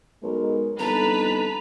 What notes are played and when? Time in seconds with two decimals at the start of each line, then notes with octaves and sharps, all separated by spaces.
0.23 B1 G#3 A#4
0.79 G1 F2 D#4 A4 B4 A5 A#5 B6